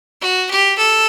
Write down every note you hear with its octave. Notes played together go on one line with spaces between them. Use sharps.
F#4
G4
A4